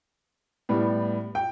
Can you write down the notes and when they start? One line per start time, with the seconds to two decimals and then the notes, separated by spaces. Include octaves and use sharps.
0.69 A2 G3 B3
1.35 G5